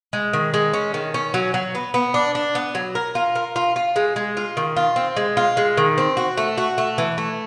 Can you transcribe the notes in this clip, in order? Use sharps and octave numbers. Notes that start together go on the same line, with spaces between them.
G#3
D#3
G#3
C#4
D#3
C#4
F#3
F#3
B3
B3
D4
D4
B3
F#3
A#4
F4
A#4
F4
F4
G#3
G#3
F4
D#3
F4
C4
G#3
F4
G#3
D#3
C4
F#4
A3
F#4
A3
E3
A3